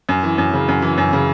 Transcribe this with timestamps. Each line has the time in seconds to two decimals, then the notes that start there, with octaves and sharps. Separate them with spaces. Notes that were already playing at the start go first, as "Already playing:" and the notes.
0.09 F#2
0.23 E3
0.38 F#2
0.54 C#3
0.68 F#2
0.82 E3
0.98 F#2
1.13 C#3